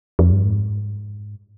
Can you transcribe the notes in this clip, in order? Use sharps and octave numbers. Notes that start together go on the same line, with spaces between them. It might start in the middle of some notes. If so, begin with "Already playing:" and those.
F2
G2
G#2